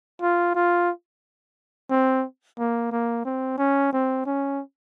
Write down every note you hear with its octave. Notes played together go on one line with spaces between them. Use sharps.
F4
F4
C4
A#3
A#3
C4
C#4
C4
C#4